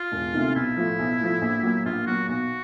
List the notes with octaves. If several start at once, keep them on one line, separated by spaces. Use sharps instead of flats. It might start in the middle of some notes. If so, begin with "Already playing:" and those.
Already playing: F4
E1
D2 C3 D#3
B1 E4
A2 F3
B1
A2 F3
A#1
A#2 F#3
A#1 F4
A#2 F#3 F#4
B1 F#4